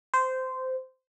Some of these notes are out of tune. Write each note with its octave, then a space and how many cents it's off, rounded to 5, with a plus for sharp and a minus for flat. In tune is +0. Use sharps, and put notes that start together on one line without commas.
C5 -15